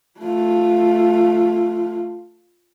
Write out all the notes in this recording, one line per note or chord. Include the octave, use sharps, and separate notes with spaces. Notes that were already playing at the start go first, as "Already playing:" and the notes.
A3 F4